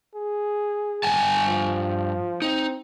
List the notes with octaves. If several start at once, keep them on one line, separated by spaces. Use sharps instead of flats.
G#4
G2 G#5 A5
F3
C4 D#4